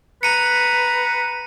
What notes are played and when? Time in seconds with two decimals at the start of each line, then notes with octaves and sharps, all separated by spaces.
0.23 B4 A#5 C#7 D#7